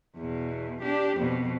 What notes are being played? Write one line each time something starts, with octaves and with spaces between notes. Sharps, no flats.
E2 B2
D4 G4
F2 B2